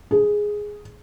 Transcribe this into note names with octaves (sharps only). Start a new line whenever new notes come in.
G#4